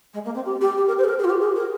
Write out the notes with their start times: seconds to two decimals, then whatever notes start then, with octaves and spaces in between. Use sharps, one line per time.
0.13 G#3
0.24 A#3
0.34 C4
0.45 G4
0.60 G4
0.76 G4
0.87 A#4
0.98 C5
1.04 G#4
1.08 A#4
1.18 G#4
1.24 F4
1.29 G4
1.40 G#4
1.55 A#4